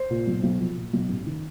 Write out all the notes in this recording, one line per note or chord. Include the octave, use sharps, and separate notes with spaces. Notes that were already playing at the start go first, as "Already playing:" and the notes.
Already playing: C5
A#2
B1
B1
F3
A#2
B1
A1
D#3